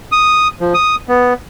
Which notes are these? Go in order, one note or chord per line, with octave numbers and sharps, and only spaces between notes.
D#6
F3
D#6
B3